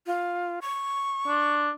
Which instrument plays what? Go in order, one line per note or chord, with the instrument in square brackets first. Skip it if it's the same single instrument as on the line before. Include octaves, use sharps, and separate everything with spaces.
[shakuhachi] F4
C#6
[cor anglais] D4